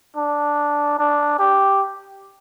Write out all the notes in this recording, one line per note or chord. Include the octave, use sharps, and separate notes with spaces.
D4
D4
G4